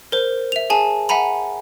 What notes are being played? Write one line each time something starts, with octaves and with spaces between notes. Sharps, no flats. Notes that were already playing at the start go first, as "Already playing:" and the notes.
A#4 C5
E5 F7
G#4 G#5 A5
E5 F#5 G#5 A#5 B5